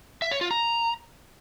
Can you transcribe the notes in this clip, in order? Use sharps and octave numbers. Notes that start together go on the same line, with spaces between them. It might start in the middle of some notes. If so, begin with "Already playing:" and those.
E5
C#5
F4
A#5